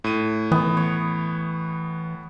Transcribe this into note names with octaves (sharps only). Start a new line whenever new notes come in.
A2 D#7
E3 B3
C#5